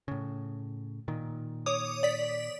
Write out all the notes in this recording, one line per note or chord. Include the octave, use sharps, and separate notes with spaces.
A2 C#3
A#2 D#3
C#5 D6 D#6
D5 B6